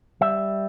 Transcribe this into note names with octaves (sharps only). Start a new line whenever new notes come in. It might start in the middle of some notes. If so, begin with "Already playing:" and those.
G3 E5